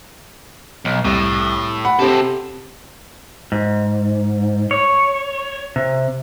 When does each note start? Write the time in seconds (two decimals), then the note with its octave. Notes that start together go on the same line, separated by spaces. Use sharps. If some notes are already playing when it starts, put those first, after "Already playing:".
0.85 B1
1.05 C2 A2
1.85 F#5 B5
1.99 C3 C4 G4 A4
3.52 G#2
4.71 C#5
5.76 C3